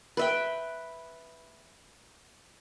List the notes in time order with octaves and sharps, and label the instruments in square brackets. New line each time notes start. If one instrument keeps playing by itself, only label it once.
[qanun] B4 E5 G5